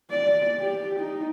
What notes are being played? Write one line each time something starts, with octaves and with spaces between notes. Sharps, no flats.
D5
G4
D#4